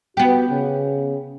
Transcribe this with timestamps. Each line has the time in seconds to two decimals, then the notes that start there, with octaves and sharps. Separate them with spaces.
0.17 B3 F#4 G4
0.49 C#3